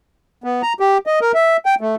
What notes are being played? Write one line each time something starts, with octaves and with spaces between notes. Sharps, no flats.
B3
A#5
G4
D#5
A#4
E5
G5
A3